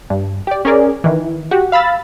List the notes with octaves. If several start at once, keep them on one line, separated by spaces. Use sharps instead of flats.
G2
G4 D5
C#4 G#4 A#4 D5
D#3 E3
F#4 G4
F5 B5 E6 A6